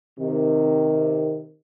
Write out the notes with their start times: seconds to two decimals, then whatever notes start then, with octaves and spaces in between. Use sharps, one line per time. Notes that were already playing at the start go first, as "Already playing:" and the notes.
0.19 C3 D#3